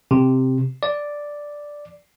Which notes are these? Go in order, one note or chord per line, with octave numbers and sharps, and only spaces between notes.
C3
D5